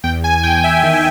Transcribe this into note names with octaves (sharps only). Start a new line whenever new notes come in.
E2 G5
E2 G#5
E2 G5
E2 E5
D#3